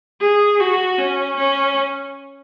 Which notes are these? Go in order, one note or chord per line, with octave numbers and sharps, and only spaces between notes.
G#4
F#4
C#4
C#4